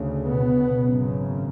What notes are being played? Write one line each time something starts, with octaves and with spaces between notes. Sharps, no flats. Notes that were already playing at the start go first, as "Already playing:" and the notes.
Already playing: D2 C#3
B2 B3
G#1 F#2 C#3